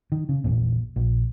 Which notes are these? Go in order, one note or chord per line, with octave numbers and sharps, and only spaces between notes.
D#3
C#3
A1 E2 A#2
A#1